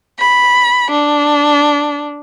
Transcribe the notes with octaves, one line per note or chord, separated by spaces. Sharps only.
B5
D4